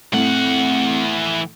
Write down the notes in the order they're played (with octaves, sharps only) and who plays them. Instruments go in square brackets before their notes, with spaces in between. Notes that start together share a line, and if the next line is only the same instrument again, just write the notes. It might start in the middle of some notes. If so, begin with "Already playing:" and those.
[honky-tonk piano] A2 [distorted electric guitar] E3 F#5 [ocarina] C4